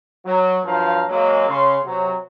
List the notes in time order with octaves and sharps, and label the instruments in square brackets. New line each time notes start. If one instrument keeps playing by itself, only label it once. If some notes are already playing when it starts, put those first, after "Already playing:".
[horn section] F#3
G2 F3 F#3 F5 A5 A#5
F#3 G#3 A#3
C#3 C6
C3 F#3